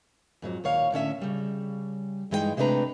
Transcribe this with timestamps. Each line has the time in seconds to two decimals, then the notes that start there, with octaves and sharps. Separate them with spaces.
0.42 F2 G#2 F#3
0.64 D#2 A#2 C#5 F5
0.92 A2 D3 C#4 E5
1.22 C#3 G3
2.31 G2 E3 G#3 D#4 G#4 G5
2.57 C3 G#3 A3 D4 B4 A#5